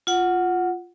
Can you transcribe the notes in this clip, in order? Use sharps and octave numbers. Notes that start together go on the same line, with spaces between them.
F4 F#5